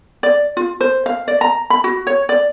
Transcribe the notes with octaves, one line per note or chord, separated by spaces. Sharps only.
D5
F4
C5
F5
D5
A#5
B5
F#4
C#5
D5